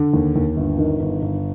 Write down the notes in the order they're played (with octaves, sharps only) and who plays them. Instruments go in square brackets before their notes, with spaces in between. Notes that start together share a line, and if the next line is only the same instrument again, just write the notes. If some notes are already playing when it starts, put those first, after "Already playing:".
Already playing: [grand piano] D3
D#2
D#2
G1
D#3
G1
G1